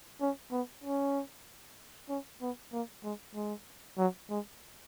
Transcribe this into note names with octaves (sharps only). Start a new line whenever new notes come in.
C#4
B3
C#4
C#4
B3
A#3
G#3
G#3
F#3
G#3